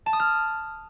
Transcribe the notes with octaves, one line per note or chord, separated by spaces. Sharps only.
A5
D#6
F6